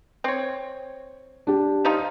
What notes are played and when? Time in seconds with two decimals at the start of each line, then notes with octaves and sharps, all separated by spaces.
0.24 C4 C#5
1.47 D4 G4
1.85 F3 D#4 F4